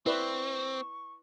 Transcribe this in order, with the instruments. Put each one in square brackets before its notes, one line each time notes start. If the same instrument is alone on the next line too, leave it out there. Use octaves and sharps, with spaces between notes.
[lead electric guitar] C4 [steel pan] E4 B4 D5 [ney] C#6